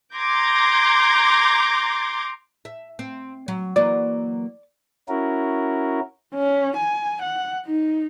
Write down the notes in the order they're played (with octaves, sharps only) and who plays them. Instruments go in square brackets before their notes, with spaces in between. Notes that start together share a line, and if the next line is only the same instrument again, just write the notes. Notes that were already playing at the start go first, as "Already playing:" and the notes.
[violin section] A#5 C6 D6 G6 G#6 A#6
[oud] E5
C4
F#3
[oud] E3 F#3 A#3 [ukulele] D5
[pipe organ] C#4 E4 F#4 A#4
[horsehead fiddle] C#4
G#5
F#5
D#4